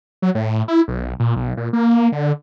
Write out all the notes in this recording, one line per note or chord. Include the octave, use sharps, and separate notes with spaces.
F#3
A2
E4
B1
A#2
B1
A#2
A#3
D3